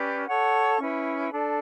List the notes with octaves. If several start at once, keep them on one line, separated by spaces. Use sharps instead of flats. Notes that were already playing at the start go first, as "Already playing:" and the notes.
Already playing: C#4 G4 B4 D5
A4 C#5 F#5 C#6
C#4 E4 B4
D4 A4 D5